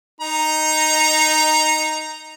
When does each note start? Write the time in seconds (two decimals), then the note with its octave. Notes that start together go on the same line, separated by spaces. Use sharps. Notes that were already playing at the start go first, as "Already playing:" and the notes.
0.21 D#4 A#5